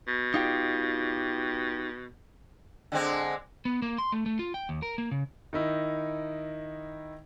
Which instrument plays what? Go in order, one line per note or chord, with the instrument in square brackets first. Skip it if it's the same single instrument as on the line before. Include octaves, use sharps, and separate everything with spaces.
[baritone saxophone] B2
[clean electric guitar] D#4 F4 G4
[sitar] D3 G#3 C4
[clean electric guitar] B3
A#3
C6
A3
A3
F4
G5
D#2
A#4
A#3
C#3
[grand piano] D#3 D#4 E4